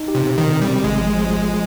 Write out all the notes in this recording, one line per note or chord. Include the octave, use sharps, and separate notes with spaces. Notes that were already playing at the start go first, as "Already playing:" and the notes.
Already playing: D#4
G4
C3
B2
C3 D#3
C3
G3
C4
G#1 G#3
F3
F3
F3